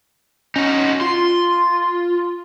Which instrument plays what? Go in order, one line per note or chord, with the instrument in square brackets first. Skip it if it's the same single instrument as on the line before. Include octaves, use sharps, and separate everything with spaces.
[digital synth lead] C#4 [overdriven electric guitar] D#4 F#4
[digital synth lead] F4 [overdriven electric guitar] C6